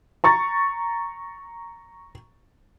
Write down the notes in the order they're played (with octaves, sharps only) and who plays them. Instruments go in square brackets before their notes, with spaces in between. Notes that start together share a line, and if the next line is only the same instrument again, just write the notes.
[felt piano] A#5 C#6 A6